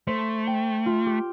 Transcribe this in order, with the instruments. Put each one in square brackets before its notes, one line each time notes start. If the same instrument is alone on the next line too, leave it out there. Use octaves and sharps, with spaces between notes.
[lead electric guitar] A3 [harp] C5
[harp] G5
F4
G4